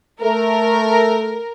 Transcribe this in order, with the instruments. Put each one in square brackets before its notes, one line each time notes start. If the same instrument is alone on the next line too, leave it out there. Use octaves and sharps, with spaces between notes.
[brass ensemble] A3 [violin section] A#4